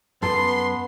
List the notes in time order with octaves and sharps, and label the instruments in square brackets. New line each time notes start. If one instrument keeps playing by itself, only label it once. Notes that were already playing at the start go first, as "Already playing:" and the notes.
[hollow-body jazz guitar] F#2 A4 [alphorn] B3 [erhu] C6